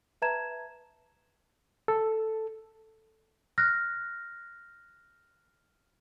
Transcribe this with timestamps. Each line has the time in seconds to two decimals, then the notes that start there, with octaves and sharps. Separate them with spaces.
0.22 B4 E5 A5 A#5 G#6 E7
1.88 A4
3.58 F6 F#6 A#6